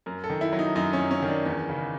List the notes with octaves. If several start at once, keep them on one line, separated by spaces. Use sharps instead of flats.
F#2 A#4
A4
D#3
E4
F#3
D#4
F#2 D#4
C#4
F#2
C#4
D#3
D4
E2 C#4
C#3